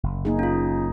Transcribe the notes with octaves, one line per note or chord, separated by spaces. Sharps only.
F#1
A#3 D#4 G#4
C#4 F4